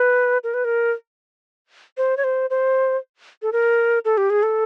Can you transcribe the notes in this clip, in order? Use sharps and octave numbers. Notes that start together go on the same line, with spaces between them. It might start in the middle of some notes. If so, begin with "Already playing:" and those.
Already playing: B4
A#4
B4
A#4
C5
C#5
C5
C5
A4
A#4
A4
G4
G#4
A4